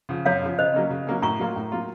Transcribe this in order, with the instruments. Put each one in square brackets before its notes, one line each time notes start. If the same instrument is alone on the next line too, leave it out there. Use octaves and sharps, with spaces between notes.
[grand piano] C#3 F3
[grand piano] F#2 [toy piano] C#5 F5
[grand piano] C#3 F3
[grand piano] C#3 [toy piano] C5 D#5
[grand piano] F#3 A#3 C#4
C#3
F#3 A#3 C#4
[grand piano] A2 [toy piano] A#5 C#6
[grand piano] F#3 A#3 F4
A2
F#3 A#3 F4